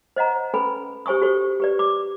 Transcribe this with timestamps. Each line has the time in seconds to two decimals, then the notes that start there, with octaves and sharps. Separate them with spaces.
0.16 C5 D#5 F#5 A#5
0.54 C#4 A4 B4 G#5 B5
1.06 G4 C5 G#5 C#6 D#6
1.22 F#4 G4 A4 C5 C#6
1.60 G4 B4 D5
1.79 D6